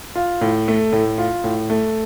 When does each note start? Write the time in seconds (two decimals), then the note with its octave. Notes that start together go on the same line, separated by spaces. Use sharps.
0.15 F4
0.41 A2
0.68 A3
0.92 A2
1.18 F4
1.44 A2
1.70 A3